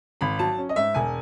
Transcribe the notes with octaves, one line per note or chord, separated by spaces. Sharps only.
G#1 B5
F#3 A5
C#4
D#5
G#2 E5
E1 G#5